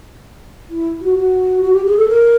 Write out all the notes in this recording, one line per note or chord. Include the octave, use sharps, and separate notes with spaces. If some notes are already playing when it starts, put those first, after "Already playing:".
E4
F#4
F#4
F#4
G4
G#4
A4
A#4